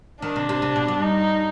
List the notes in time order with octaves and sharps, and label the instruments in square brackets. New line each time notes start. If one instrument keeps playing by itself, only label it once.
[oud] D#3 [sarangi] D4
[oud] C3
C3
C3
B2
G2
[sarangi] D#4